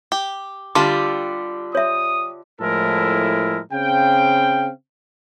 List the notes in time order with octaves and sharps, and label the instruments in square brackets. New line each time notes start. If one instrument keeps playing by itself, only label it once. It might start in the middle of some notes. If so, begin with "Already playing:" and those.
[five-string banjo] G4
[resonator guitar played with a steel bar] D3 F4 G4 [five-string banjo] G3 D5 A5 [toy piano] C6
[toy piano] C#5 E5 [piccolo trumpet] D#6
[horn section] A2 F3 G#3 E4 A4 A#4
C#3 C4 F5 G5